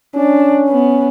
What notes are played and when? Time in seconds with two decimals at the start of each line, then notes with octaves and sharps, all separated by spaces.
0.15 C#4 D4
0.69 B3